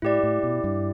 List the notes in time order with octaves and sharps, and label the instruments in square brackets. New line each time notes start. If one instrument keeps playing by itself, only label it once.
[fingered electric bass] A2 [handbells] E4 G4 D5
[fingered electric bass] A2
B2
G2